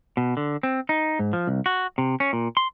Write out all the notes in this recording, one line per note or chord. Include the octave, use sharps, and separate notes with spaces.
B2
D3
C4
D#4
G#2
F3
C2
F#4
C3
C#4
A#2
C6